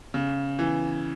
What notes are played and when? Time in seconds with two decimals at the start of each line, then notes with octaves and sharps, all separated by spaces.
0.14 C#3
0.59 E3